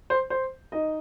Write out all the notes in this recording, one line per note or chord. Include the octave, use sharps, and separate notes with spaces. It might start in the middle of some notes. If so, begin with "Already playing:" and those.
C5
C5
D#4 D#5